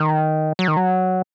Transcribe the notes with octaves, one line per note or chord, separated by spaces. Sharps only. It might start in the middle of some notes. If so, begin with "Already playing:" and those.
Already playing: D#3
F#3
D#3
F#3